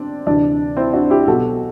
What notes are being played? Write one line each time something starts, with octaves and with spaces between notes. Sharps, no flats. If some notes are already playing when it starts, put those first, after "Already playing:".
Already playing: B2 C4 D4
D2 C3 E3 D4
C4 E4
D4 F#4
E4 G4
B1 B2 F#4 A4